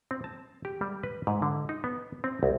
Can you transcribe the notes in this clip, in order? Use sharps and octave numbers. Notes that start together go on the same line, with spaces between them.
C4
A5
G4
G3
B4
G#2
D3
D#4
B3
C4
C2